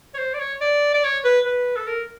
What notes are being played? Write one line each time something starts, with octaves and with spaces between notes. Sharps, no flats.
C#5
C5
D5
C#5
D5
D5
C#5
B4
B4
A4
A#4